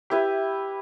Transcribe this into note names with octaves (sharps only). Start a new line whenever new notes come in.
E4 G4 B4 E5